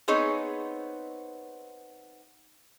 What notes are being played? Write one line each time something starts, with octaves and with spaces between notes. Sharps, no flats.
B3 C4 D#4 G#4 C#5